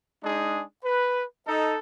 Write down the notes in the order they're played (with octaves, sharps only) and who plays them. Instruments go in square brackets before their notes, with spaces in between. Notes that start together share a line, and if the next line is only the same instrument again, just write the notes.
[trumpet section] G#3 D4 D#4 G#4
B4
D#4 A4